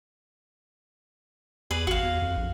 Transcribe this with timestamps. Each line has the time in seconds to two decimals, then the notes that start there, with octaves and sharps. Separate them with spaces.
1.71 E2 G#4 B4 D5
1.87 G#1 F#4 F5
2.03 E2
2.22 F2
2.37 A#1